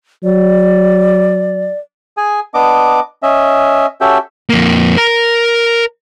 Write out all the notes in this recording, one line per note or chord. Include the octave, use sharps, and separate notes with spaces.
F#3 D5
G#4 G#5
B3 D4 D#5 D6
C#4 D#5 E5
C#4 F#4 G4 A4 E5 G5
F2 A#3
A#4 A#5